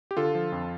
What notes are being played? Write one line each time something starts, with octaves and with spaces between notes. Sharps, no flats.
G4
D3 F4 A4
F3
F2